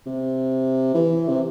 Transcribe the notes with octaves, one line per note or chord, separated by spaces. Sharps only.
C3
E3
C3